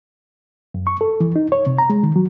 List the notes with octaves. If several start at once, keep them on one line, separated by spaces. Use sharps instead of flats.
F#2
C#6
A4
E3
D#4
C#5
C3
A#5
G#3
D#3
F#3